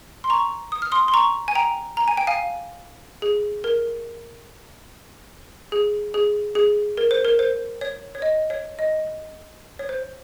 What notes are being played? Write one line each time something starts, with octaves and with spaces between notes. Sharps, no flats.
C6
A#5 C#6
D#6
F6
C6 D#6
C6
A#5 C#6
G#5
G5 A#5
A#5
G#5
G5
F5 G#5
G#4
A#4
G#4
G#4
G#4
A#4
C5
A#4
C5
C#5
C#5
D#5
C#5
D#5
C#5
C5